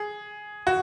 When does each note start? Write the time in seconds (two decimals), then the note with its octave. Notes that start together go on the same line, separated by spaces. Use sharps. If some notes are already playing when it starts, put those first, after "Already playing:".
Already playing: G#4
0.67 F#4